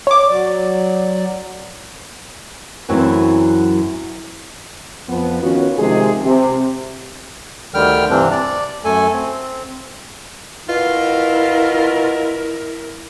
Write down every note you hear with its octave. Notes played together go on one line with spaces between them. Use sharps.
C#5 D6
F#3 D5
F#2 E3 F#3 C4 E4
F2 F3 B3
D#3 B3 C#4 F4 F#4 B4
C3 D#3 F3 G#3 G#4
C3
D2 D3 D#3 G3 G5 F6
G2 C3 E3 C4 D4
D5
F#2 A3 A4 G#5
C4
B2 E4 F4 A#4